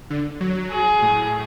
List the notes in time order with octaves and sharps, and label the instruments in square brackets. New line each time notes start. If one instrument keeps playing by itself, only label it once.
[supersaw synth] D3
F#3
[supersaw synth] F#3 [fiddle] G#4
[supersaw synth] A2